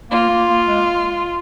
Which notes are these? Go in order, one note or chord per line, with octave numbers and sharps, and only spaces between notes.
A#3 F4
A#3
A#3
G#3